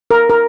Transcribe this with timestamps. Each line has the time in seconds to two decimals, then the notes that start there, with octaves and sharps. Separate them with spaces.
0.11 A#4
0.30 A#4